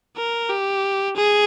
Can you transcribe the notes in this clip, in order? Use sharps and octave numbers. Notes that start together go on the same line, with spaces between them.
A#4
G4
G#4